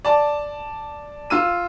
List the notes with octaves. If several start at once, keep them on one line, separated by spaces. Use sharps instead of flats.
D5 A5
F4 E6 D#7